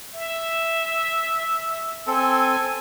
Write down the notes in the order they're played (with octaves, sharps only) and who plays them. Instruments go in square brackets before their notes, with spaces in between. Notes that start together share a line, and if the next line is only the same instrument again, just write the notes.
[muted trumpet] E5
[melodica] C4 A4 [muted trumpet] G#5